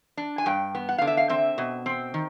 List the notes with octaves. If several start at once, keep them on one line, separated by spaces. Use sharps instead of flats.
D4
G#5
G2 G5
B3
F#5
D3 F5
E5
F5
C4 E5
B2
C4
D#3